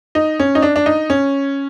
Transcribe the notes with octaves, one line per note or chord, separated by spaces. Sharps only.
D#4
C#4
D#4
D4
D4
D#4
C#4